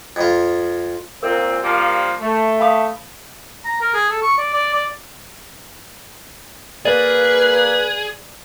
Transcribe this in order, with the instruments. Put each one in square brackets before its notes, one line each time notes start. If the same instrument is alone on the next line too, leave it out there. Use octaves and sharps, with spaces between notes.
[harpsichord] F2 F4
[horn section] A#2 C4 [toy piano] A#4
[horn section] F3 G3 A#3
A3
[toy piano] F5 B5 D#6
[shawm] A#5
A#4
G#4
A4
C#6
D5
D5
D5
[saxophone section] A#3 [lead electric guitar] G#4 [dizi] B4 [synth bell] D5